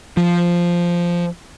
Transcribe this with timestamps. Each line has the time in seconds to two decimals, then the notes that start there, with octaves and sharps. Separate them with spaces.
0.17 F3